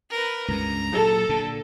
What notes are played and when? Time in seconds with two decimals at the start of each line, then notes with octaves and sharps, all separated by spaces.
0.11 A#4 B4
0.48 C#2 G2 C#3 A#5
0.93 A#2 F#3 A4
1.29 A#2 D3